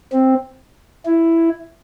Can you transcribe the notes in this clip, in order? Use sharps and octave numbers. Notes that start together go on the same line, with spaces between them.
C4
E4